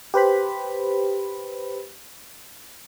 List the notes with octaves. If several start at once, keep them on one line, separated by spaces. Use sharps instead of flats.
G4 B4 C5 B5